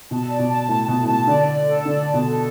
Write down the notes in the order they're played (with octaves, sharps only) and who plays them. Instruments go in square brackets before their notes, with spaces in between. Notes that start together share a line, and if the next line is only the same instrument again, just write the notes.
[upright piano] B2 [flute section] A5
[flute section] D5
[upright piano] B2
[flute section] A5
[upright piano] A2 [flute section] A5
[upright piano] B2 [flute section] A5
[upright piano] A2
[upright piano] B2 [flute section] A5
[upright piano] D3 [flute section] D5
[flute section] D5
A4
[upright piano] D3 [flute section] D5
[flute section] A5
[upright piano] B2
[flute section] A4